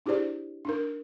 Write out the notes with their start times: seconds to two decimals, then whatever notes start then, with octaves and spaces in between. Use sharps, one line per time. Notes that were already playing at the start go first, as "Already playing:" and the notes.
0.06 D4 E4 G4 G#4 C5 D5
0.65 D4 D#4 A#4